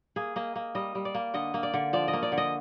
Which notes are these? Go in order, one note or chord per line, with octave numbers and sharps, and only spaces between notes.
A#3 G#4
A#3 D#5
A#3
G3 D#5
G3
D5
A#3
D3 D#5
A#3
D5
D3
F3 D5
D#5
A#3
D5
D3
D#5